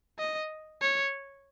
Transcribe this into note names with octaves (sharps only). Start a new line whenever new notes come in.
D#5
C#5